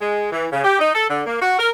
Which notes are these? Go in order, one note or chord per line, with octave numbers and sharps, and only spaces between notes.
G#3
E3
C#3
G4
D#4
A4
D3
A#3
F#4
A#4